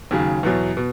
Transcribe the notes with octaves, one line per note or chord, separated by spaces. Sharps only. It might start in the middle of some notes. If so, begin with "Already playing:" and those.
D#2 C#3 F#3
E2 B2 F#3
B2